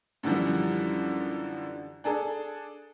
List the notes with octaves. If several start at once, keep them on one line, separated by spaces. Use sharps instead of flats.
F#2 D3 E3 F3 G3
D4 G#4 A4